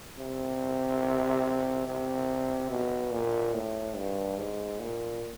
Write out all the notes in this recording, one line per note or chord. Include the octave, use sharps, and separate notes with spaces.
C3
C3
B2
A#2
A2
G2
G#2
A#2